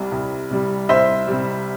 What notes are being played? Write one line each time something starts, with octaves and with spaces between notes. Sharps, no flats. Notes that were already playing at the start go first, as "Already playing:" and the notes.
Already playing: C2 C3 G3
C2
C3 G3
C2 C5 E5
C3 G3